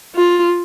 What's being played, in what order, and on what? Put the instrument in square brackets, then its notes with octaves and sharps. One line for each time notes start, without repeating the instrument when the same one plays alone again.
[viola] F4